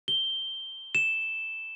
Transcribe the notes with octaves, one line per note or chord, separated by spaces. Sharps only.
G7
E7